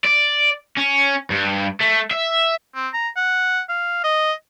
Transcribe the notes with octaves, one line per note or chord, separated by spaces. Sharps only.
D5
C#4
G2
A3
E5
C4
A#5
F#5
F5
D#5